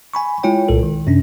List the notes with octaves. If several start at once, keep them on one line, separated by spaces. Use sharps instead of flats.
G#5 B5 C#6
G#3 E4 F4 C#5 G5
C2 A#2 A4
D#3
F#2 C3 C#4 D4